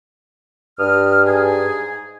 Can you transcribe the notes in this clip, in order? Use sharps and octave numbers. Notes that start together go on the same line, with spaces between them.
G2 D#6 F6
G#2 G#4